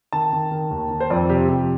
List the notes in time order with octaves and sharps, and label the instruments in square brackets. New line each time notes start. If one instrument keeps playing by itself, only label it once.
[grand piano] D#3 A5
D#3
D#3
D#2
D#3
C5
F2 D5
C3 G4
F2 G4